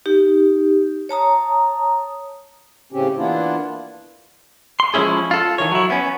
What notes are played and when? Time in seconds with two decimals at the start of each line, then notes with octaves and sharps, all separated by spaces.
0.06 D#4 G4
1.09 C#5 A5 A#5 D#6
2.92 A2 C#3 C4 C#4 G4
3.17 E3 A#3 B3 D4 E4 F4
4.80 C6
4.94 F3 G#3 A#3 C#4 E4 G#4
5.31 F4 A4
5.58 D#3 E3 C#5
5.72 F#3 E4
5.90 B3 C#4